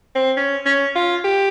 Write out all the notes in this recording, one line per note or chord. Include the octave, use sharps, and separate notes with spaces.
C4
C#4
C#4
F4
G4